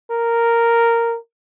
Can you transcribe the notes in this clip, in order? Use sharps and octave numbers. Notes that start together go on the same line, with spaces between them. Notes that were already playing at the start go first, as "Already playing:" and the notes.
A#4